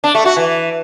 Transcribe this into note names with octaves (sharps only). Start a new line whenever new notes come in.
D4
A3
F#4
E3